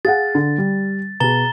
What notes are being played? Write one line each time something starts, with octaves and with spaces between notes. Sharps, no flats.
G#4 F5 F#5 A6
D3
G3
B2 G#4 A#5 A6 G7